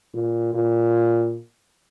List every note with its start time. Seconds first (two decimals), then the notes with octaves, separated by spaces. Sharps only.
0.14 A#2
0.54 A#2